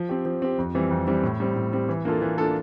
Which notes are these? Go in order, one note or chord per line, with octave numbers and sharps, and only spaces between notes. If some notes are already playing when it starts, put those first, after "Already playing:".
Already playing: F3
C4 G4
F3
C4 G4
F2
E3 G3 C4
F2
E3 G3 C4
A2
G3 C4
A2
G3 C4
E3
A#3 D4 F4 A4
E3
A#3 D4 F4 A4